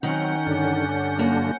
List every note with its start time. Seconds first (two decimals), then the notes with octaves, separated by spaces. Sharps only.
0.03 D#3 F#3 C4 C#4 A#4 F#5 G6
0.46 G2 D3 D4
1.19 F#2 A#3